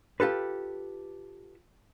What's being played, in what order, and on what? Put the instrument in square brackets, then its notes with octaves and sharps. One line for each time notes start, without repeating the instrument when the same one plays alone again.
[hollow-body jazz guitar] F4 G4 A4 B4